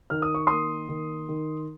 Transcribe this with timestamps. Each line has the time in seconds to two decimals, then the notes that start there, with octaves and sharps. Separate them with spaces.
0.10 D#3 F6
0.22 D#6
0.34 C#6
0.47 A#3 C6 D#6
0.89 D#3
1.29 D#3